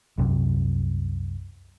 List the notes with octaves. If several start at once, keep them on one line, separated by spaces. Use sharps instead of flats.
C2 F#2 C3 F#3